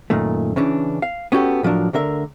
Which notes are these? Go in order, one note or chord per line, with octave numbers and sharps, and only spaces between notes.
F#2 A#2 D#3 A3
C#3 E3 C#4 D4
F5
B3 C#4 F#4 G4 A4
A2 F3 F#3 D4 A#4
D2 D3 A#4 E5